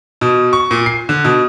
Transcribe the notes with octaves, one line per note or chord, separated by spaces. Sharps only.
B2
C#6
A#2
C7
D3
B2